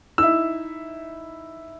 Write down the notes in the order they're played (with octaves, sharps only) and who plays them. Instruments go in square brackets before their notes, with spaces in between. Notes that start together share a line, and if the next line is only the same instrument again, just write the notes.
[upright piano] D#4 E4 [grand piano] E6